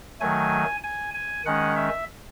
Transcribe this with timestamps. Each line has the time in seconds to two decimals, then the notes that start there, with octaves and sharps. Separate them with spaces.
0.21 D#3 F#3 A3 G#5
0.84 G#5
1.14 G#5
1.45 D#3 G#3 C#4 F#5
1.76 E5